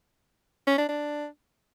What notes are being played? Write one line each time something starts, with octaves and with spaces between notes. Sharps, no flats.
C#4
D4
D4